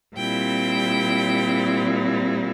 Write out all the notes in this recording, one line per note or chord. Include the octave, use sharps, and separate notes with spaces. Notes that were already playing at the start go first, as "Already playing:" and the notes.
A#2 G3 C4 E4 G5